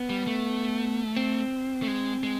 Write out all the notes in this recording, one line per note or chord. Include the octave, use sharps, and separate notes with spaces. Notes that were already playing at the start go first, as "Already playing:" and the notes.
Already playing: B3
G3
A3
C4
A3
G#3
G#3